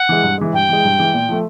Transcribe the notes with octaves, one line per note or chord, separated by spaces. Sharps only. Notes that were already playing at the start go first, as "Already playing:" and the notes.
Already playing: F#5
E3 G#3
G2
E3 G#3
G2 G5
E3 G#3
G2
E3 G#3
A#2
F3 A3